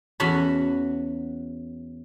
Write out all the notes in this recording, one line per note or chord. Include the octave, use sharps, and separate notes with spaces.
E2 C#4 F#4 A5 B5